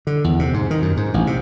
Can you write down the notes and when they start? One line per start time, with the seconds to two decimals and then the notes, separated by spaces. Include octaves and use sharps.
0.07 D3
0.24 E2
0.39 C3
0.54 G#2
0.71 D#3
0.82 F#2
0.97 G#2
1.14 A1
1.27 C3